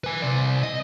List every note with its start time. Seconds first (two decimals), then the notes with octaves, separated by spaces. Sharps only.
0.04 B4 G#5
0.22 C3 D5
0.63 D#5